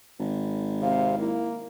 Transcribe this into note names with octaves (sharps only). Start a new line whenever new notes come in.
G#1
C3 F5
A#3 E4